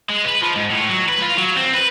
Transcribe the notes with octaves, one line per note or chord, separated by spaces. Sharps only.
G#3
B4
F3
G#2
A2
F#3
B4
F4
F#3
C4
B4